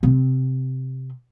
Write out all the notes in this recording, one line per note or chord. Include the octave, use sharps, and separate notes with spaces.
C3 C4